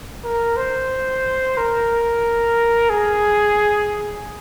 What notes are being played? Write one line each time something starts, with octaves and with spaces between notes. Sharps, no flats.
A#4
C5
A#4
G#4